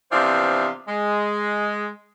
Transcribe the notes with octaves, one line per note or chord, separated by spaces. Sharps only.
C3 E3 F3 B3 D4 F4
G#3